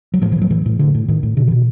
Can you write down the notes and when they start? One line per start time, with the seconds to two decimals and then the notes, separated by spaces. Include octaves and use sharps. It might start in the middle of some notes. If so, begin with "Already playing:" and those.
0.14 F#3
0.21 A2 F3
0.32 E3
0.36 A2
0.42 F#3
0.50 A2 E3
0.66 A2
0.79 A2 D3
0.94 A2
1.08 A2 D#3
1.23 A2
1.37 B2 D3
1.47 E3
1.51 B2